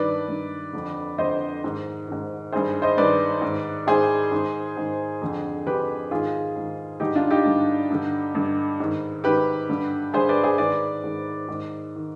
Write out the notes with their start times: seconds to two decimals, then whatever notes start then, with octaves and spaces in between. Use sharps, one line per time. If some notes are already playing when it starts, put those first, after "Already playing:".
Already playing: G2 D#3 B4 D5
0.28 G2 D#3
0.73 F2 D3
1.18 F2 D3 C5 D#5
1.64 G#2 D#3
2.07 G#2 D#3
2.52 G2 D#3 G#4 C5
2.82 C5 D#5
2.97 G2 D#3 B4 D5
3.42 G#2 D#3
3.87 G#2 D#3 G#4 C5
4.32 G#2 D#3
4.77 G#2 D#3
5.22 F2 D3
5.66 F2 D3 G4 B4
6.11 G#2 D#3 F4 G#4
6.56 G#2 D#3
7.00 G2 D3 D#4 G4
7.15 D4 F4
7.31 D#4 G4
7.45 G2 D3
7.91 G2 D3
8.35 G2 D3
8.80 G#2 D#3
9.24 G#2 D#3 G4 B4
9.69 G2 D3
10.14 G2 D3 G#4 C5
10.29 B4 D5
10.43 G#4 C5
10.58 G#2 D#3 B4 D5
11.04 G#2 D#3
11.49 G#2 D#3
11.96 D#3